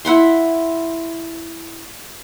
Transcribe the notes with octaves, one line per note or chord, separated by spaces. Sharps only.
E4 F#5 B5 C6